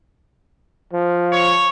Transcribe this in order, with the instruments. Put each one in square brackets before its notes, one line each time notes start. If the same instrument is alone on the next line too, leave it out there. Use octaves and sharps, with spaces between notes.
[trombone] F3
[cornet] C#5